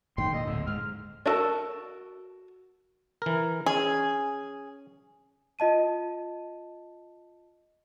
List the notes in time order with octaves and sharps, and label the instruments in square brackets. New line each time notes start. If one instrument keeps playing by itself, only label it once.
[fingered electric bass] F#1 A2 D#3 [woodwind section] G5 C6
[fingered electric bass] A#2 [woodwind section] A4 D#5
[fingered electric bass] D1 A2 [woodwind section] D3
[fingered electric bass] G#2 [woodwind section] F6
[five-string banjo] D4 F#4 A4 A#4 A5
[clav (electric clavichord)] E3 A#4
[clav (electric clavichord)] C#4 [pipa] G#4
[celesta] F4 D#5 A5 D#7